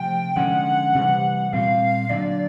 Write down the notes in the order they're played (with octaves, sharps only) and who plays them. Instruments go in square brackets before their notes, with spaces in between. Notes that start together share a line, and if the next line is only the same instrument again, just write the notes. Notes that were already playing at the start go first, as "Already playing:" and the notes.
Already playing: [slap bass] C3 F3 A3 [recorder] G5
[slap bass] D3 F3 G#3 C#4 [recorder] F#5
[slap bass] C3 E3 G3
[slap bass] A#2 G3 C4 [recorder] F5
[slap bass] D3 F#3 A#3 D4 [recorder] D5